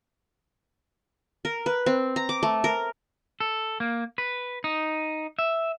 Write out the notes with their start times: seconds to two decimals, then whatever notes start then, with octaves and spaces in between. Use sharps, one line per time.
1.45 A#4
1.66 B4
1.86 C4
2.16 A#5
2.29 D6
2.43 A3
2.64 A#4
3.40 A4
3.80 A#3
4.18 B4
4.64 D#4
5.39 E5